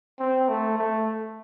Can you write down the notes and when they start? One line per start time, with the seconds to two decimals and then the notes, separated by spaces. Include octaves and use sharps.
0.19 C4
0.49 A3
0.78 A3